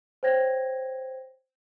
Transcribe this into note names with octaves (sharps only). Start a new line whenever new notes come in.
C5 C#5 G5 G#6 A#6